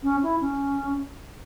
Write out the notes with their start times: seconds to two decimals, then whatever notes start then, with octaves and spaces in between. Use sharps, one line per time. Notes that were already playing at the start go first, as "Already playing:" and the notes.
0.03 C#4
0.23 E4
0.41 C#4